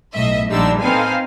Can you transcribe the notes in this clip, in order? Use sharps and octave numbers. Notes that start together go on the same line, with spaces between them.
B1 A2 D#5 E5
A#1 D3 G3 D4 D#4 E6
C4 D#4 A4 B4 F5 G#5